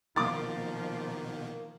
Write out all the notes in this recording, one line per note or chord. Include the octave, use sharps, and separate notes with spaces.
B2 D#3 F3 A#3 D6 A6